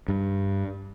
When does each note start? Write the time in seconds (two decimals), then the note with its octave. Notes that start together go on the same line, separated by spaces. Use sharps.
0.08 G2